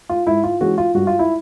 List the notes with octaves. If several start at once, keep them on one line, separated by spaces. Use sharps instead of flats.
F4
G#2 E4
F4
E3 G#3 C#4 F#4
F4
G2 F#4
F4
E4